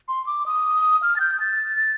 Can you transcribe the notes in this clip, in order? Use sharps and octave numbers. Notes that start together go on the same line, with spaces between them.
C6
D6
D#6
F6
A6
G6
A6